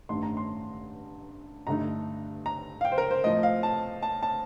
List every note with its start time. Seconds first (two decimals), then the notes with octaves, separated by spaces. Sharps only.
0.09 A1 G2 D#3 A3 C6
0.23 A#5
0.37 C6
1.67 G2 D3 A3 D#4 A#5
2.46 A#5
2.81 F5
2.85 G5
2.92 C5
2.98 A#4
3.11 C5
3.24 A2 F3 C4 D#5
3.43 F5
3.63 A5
4.03 A5
4.23 A5